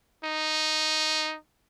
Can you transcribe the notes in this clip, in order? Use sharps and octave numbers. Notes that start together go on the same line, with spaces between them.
D#4